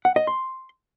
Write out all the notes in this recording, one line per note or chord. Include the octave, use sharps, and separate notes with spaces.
F#5
D#5
C6